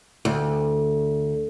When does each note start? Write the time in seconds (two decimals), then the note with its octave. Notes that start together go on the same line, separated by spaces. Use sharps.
0.25 D2